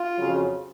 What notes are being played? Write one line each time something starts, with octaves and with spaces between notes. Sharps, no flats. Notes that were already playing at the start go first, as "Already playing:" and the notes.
Already playing: F4
F2 C#3 F#3